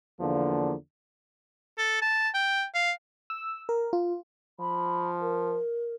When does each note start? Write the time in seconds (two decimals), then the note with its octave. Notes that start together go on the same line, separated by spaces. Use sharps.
0.20 E2 D3 F3 A#3
1.78 A4
2.02 A5
2.34 G5
2.74 F5
3.30 E6
3.69 A#4
3.93 F4
4.60 F3 B5
5.21 A#4